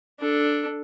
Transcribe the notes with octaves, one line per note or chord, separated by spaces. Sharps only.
D4 A4